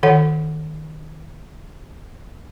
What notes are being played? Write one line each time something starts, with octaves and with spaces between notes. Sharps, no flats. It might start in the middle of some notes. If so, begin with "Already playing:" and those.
D#3 A4 C#5 F#5